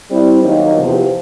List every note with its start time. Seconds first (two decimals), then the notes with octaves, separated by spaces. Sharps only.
0.10 G3 C4 E4
0.42 D#2 D#3 F#3 A#3 D#4
0.75 E2 C3 F3